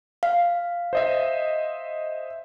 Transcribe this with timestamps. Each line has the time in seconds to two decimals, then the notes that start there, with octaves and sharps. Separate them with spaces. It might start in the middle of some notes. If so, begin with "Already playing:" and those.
0.23 F5
0.93 C5 D#5 E5